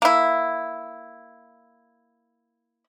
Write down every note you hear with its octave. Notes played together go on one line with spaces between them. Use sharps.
A#3 E4